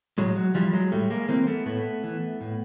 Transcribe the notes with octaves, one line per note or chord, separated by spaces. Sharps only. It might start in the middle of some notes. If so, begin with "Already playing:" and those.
A2 F#3 G#3
F#3
E3 F3 G3
F#3 G#3
A2 G3 A3
G#3 A#3
E3 A#3 C4
A3 B3
A2 A3 B3
E3
A2